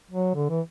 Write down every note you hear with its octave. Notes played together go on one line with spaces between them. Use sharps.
F#3
D3
E3